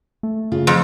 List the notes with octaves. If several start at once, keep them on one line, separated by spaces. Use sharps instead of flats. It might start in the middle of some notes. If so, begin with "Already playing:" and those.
A3
C#3 F4
F2